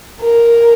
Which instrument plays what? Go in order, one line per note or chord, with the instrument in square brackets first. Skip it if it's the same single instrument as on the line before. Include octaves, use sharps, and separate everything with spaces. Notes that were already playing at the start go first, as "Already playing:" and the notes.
[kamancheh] A#4